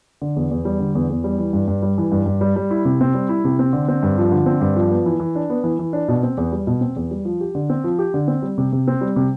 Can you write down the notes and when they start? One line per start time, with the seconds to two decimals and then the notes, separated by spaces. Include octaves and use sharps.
0.22 D3
0.36 E2
0.51 E2
0.65 G3
0.80 D3
0.95 E2
1.10 E2
1.24 G3
1.38 E3
1.53 G2
1.68 G2
1.82 G3
1.98 E3
2.12 G2
2.26 G2
2.41 G3
2.56 G3
2.71 E4
2.85 C3
3.01 C4
3.14 G3
3.29 E4
3.44 C3
3.59 C4
3.73 D3
3.88 C4
4.03 G2
4.18 F3
4.32 D3
4.46 C4
4.61 G2
4.76 F3
4.91 B3
5.06 E3
5.20 E3
5.35 D4
5.50 B3
5.64 E3
5.79 E3
5.93 D4
6.08 B2
6.23 C4
6.37 E2
6.52 G3
6.67 B2
6.81 C4
6.96 E2
7.11 G3
7.25 F3
7.41 G4
7.55 D3
7.70 C4
7.84 F3
7.99 G4
8.14 D3
8.28 C4
8.42 G3
8.58 C3
8.72 C3
8.88 C4
9.01 G3
9.16 C3